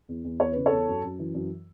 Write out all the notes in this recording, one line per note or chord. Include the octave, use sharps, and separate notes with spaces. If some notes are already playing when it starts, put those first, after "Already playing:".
E2
E2
E2 C#5
C#3 B4
A4 C#5
E2
F#2
F#2
E3
F#2